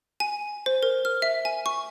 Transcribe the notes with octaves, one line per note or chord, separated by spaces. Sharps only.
G#5
C5
A#4
F6
E5
G#5
C#6